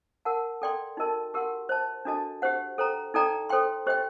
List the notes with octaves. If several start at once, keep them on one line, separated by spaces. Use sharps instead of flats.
A#4 F#5 A5
A4 D5 G5 C6
D#4 F#4 A#4 D#5 A5
G4 A#4 F#5 C6
C5 D#5 A5
D4 F#4 A4 D#5 A5
G4 C5 F#5
A4 C5 G5 A#5
D#4 A4 D5 G5 A#5
A4 C5 G5 C6
G4 C5 D#5 G5